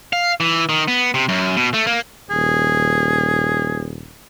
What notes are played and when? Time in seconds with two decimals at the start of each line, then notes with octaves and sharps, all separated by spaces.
0.13 F5
0.40 E3
0.69 D#3
0.88 B3
1.14 C3
1.29 F#2
1.57 B2
1.74 A3
1.87 A#3
2.30 D#1 G#4